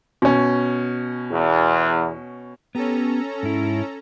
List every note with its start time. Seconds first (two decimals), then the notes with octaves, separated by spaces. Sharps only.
0.22 B2 C#4
1.31 E2
2.75 B3 C#4 G4 A4 A#5
3.43 G#2 E4